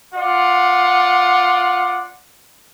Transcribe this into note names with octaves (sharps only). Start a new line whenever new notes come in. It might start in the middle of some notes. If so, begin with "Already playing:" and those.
F4 D5 F#5